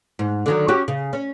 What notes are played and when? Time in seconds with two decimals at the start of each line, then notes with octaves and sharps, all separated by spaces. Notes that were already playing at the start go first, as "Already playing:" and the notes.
0.19 G#2
0.46 D3 D#3 F#3
0.68 C#4 F#4 G4
0.88 C#3
1.13 C#4